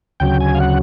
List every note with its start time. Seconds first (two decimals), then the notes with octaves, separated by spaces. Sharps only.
0.20 D2 C#3 F#3 G5
0.40 G#5
0.55 F5
0.60 F#5